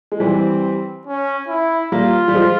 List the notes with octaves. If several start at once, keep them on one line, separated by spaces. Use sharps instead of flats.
G#3
E3 G3 C4
C#4
E4
G3 A#3 F4
G3
F3 G#3